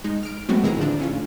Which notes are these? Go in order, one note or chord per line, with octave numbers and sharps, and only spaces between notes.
G#3 D#4
F6 D7
F#3 G#3 A3 B3 C4 F#4
A1 D#3 E4 G#4 A#5
D3 D#3 F3 D4
A2 C#4 F4